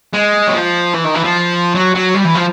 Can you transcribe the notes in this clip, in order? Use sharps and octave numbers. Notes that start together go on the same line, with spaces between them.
G#3
F#3
F3
E3
D#3
E3
F3
F#3
F#3
G3
E3
F3